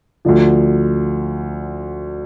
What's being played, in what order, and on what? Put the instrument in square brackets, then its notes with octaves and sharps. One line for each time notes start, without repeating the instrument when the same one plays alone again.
[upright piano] D2 D3 F3